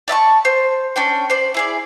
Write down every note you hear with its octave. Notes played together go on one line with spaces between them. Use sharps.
D5 E5 A5 C#6
C5
C#4 D4 G5
C5 D5
E4 G#4 D5